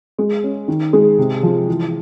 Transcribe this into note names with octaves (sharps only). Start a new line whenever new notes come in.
G#3
C#4
D#3
G#3
C3
F3
E3